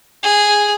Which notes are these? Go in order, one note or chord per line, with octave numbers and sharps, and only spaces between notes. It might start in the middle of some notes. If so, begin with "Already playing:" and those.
G#4